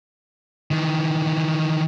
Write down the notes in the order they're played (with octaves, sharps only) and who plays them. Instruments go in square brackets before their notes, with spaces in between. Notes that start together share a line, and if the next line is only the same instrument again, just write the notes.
[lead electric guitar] D#3 E3